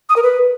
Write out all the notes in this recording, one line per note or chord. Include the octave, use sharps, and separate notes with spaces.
D#6
A#4
B4